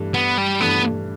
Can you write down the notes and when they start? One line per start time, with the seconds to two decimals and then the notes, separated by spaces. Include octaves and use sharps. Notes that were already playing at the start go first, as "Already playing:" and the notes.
Already playing: G2 E3 A3
0.14 B3
0.38 G3
0.61 G2 E3 A3 B3